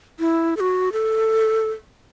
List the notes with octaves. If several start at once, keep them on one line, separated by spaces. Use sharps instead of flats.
E4
A4
F#4
A4